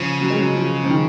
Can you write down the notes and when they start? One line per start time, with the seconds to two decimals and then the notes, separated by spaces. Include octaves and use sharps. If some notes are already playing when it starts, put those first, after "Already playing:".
Already playing: C#3 F3
0.21 F#3
0.30 G#3
0.39 F#3
0.55 F3
0.84 F3
0.90 D#3